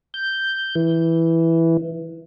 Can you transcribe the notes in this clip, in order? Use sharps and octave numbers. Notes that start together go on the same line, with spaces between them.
G6
E3